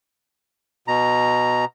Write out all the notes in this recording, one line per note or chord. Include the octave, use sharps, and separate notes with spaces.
B2 A#5